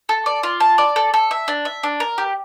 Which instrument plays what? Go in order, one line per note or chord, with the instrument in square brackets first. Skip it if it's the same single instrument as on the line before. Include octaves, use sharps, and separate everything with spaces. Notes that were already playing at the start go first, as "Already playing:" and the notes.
[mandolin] A4
D5
F4
A5
D5
A4
A4
E5
D4
E5
D4
A#4
G4